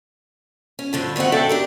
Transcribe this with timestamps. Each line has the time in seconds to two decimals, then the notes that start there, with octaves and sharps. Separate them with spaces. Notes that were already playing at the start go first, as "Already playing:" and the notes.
0.79 C#4
0.93 G2 D3 F3
1.16 D#3 A3 C4 D#5 F#5
1.32 F#2 D4 A4 D5 E5 G5
1.49 D4 G4 A#4